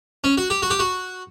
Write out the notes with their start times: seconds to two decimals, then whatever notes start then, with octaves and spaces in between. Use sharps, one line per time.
0.24 C#4
0.38 F#4
0.50 G4
0.62 F#4
0.70 G4
0.79 F#4